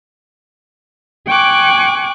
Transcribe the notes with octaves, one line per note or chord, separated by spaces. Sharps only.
G5 G#5 C#6 D6 F#6